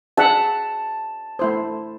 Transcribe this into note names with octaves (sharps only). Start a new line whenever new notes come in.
G#4 E5 F#5 A5
A3 E4 C5